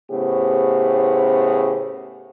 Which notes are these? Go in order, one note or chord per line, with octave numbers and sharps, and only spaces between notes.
A2 C#3 B3 G4 C5